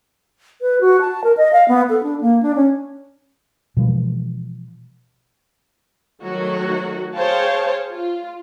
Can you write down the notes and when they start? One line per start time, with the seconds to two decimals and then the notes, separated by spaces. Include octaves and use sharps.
0.62 B4
0.81 F#4
1.01 A5
1.24 A#4
1.37 D#5
1.53 F5
1.68 B3
1.90 A4
2.03 D4
2.21 A#3
2.43 D4
2.56 C#4
3.77 B2 E3 F3 G#3
6.23 D#3 F#3 A3 F#4
7.15 G#4 C5 C#5 F5 G5 A5
7.91 F4